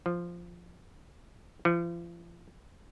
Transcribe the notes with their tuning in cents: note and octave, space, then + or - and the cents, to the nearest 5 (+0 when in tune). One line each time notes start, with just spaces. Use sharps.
F3 -5
F3 -40